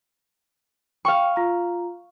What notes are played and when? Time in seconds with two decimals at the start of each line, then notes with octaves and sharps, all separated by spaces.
1.05 F5 G5 C#6
1.36 F4 A#5